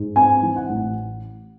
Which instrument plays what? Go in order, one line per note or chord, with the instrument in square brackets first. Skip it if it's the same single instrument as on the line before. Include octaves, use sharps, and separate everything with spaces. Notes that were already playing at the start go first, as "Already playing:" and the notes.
Already playing: [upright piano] G#2
C4 G#5
E3
F#5
A1